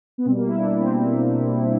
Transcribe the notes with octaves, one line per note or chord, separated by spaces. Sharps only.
B3
B2 G3 C4
A#3
E4
B2 G3 D4
C4